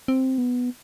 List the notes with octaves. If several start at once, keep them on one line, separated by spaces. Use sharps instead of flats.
C4
B3